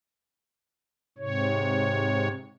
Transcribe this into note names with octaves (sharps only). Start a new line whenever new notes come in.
G#2 C3 C#5